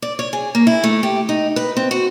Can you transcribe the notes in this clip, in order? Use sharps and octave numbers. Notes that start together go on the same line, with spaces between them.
D5
C#5
G#4
A#3
E4
A3
G4
D#4
B4
C4
F#4